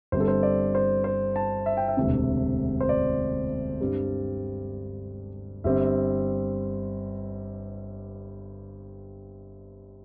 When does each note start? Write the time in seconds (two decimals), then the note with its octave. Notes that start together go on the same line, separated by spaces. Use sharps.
0.12 G1 G2 G3 C4 C5
0.20 A4
0.28 C5
0.43 D5
0.75 C5
1.04 C5
1.36 A5
1.66 E5
1.77 G5
1.88 E5
1.97 E1 D2 C3
2.81 C5
2.89 D5
3.81 G2 G3 C4
5.64 G1 G2 G3 C4 E5